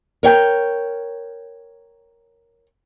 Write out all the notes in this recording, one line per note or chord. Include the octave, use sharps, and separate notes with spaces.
A#4 C#5 G5